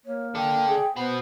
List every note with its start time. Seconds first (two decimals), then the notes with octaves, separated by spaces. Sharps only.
0.06 A#3 C#5
0.35 A4 D5 G5
0.68 G#4
0.96 B3 F#4 B4 C5